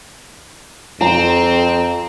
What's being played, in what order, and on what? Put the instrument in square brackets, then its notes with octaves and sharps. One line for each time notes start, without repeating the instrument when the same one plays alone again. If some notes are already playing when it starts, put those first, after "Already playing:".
[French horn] F2 [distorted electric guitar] C4 [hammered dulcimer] A#5